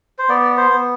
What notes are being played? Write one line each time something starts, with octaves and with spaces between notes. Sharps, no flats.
C5
B3 D5
C5
B3